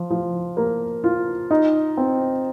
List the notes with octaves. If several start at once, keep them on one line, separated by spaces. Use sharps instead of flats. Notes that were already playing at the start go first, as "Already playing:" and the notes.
Already playing: F3
F3
A#3
F4
D#4
C4